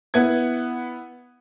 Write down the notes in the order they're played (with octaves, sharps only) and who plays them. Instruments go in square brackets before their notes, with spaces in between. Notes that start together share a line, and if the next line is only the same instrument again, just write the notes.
[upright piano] B3 E4 F#5 G#6